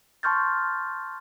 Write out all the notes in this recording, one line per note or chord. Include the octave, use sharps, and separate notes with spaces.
A5 C6 C#6 F6 G6 A6